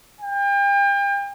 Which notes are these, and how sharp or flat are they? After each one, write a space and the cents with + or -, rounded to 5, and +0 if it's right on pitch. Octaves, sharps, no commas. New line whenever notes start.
G5 +35